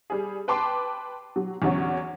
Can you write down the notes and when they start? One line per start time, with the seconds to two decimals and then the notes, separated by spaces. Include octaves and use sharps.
0.10 G3 G#4
0.48 B4 G5 A5 C6 D6
1.36 F#3
1.62 E2 D3 F#3 C#4 F#4 C#5